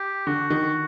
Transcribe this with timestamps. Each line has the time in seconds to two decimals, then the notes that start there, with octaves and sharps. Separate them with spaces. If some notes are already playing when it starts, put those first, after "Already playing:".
Already playing: G4
0.27 D3 F#4
0.50 D#3